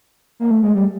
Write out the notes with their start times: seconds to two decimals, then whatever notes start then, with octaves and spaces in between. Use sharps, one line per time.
0.40 A#3
0.51 A3
0.63 G#3
0.75 G3